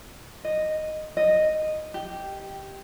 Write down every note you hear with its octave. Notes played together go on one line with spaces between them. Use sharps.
D#5
D#5
G4